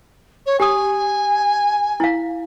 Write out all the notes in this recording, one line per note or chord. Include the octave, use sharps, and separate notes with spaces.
C#5
G4 G#5 D#6
E4 F5